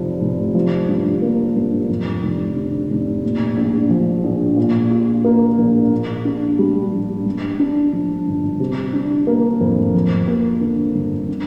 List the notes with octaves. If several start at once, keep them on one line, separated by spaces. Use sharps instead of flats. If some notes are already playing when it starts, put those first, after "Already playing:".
Already playing: F1 F3
F1
F3
G2
A#3
G2
F2
F1
D3
F1
A#2
A#1
F3
A#1
A#2
F4
A#3
A#1
A#2
D4
G3
A#1
G2
D4
F3
G1
C3
D4
A#3
F2
F2
A#3
D3
G1
D3